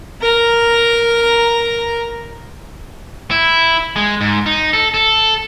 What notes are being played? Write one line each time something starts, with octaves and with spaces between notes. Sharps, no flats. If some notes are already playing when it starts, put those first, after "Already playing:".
A#4 A#5
E4
G#3
G#2
D#4
A4
A4